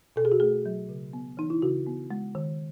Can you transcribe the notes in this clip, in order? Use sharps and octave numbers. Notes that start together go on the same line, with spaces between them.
B2 A4
G#4
F#4
A3 G#4
F#3
C#3
B3
E3 D#4
E4
C#3 F#4
B3
G#3
D#3